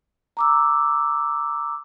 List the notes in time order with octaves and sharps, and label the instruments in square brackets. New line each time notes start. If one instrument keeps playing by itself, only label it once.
[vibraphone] A#5 D6 E6